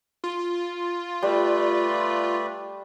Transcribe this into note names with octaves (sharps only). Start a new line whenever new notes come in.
F4
G3 A3 B4 D5